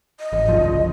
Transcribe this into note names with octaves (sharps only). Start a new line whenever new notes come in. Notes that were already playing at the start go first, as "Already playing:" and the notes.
D#5
G#1
F#1 C2 F3